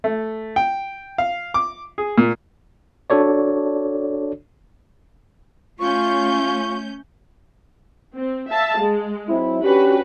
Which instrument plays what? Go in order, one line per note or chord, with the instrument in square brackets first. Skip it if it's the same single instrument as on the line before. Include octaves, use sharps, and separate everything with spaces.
[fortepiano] A3
G5
F5
D6
G#4
A#2
[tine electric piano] D4 F#4 A4 C#5 D5
[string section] A3 C#4 G6 [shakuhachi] F4 [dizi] C#6
[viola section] C4
E5 F5 A5
G#3
[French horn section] F#3 C4 E4
[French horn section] C#4 D4 G4 [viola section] F#4 B4